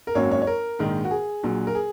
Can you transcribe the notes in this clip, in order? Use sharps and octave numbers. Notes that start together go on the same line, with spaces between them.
A#4
G#1 F#2 F#3 A#3 C#5
C#5
C#5
A#4
A#1 G#2 D#3
F#4
G#4
A#1 A#2 F#3
A#4
G#4